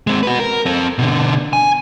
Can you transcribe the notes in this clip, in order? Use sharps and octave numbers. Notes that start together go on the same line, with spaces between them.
G#3 C4
F#4 B4
A#4
C4 A4
B2 D3
G#5